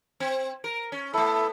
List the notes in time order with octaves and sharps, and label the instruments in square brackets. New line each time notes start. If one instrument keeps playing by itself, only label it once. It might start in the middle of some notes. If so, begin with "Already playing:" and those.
[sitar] C4
A#4
C#4
[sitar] A3 B3 [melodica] E4 A4